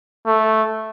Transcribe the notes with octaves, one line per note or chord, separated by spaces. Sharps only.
A3